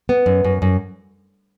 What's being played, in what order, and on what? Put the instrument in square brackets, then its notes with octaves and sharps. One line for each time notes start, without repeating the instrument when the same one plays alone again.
[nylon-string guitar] B3
F#2
F#2
F#2